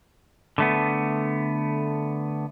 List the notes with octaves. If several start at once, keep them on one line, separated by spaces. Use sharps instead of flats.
D3 A3 B3